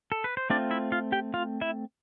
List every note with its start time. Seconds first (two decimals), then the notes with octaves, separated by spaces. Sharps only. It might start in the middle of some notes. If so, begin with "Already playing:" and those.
0.12 A4
0.24 B4
0.37 C5
0.50 A3 C4 D4 F4 D5
0.71 E4 E5
0.92 F4 F5
1.12 G4 G5
1.34 F4 F5
1.61 E4 E5